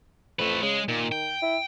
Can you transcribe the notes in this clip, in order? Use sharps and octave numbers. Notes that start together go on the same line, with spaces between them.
F2 A3 B4
C#3 G#3
A#2 D#3
G5
E4